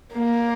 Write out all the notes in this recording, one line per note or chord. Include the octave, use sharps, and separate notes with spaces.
A#3